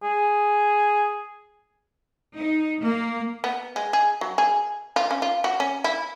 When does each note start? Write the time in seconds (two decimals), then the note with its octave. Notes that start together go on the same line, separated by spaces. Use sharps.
0.03 G#4
2.35 D#4
2.82 A#3
3.44 B3
3.76 G#3
3.93 G#4
4.21 F#3
4.38 G#4
4.96 F4
5.11 C#4
5.22 F4
5.44 F#4
5.60 C#4
5.84 E4